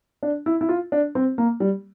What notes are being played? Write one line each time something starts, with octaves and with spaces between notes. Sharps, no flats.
D4
E4
E4
F4
D4
C4
A#3
G3